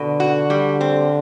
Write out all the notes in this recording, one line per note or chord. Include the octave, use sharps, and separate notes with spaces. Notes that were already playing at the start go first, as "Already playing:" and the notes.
Already playing: B2 D3
F#4
G3
C4